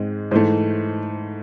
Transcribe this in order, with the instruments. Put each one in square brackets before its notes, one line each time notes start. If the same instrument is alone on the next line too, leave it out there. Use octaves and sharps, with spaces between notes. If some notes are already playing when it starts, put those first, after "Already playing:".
Already playing: [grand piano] G#2 G#3 C4
G#2 E3 A3 C5